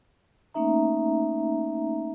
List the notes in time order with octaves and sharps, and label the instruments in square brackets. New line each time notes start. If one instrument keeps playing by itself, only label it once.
[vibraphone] A3 A#3 C#4 D#4 E5 A#5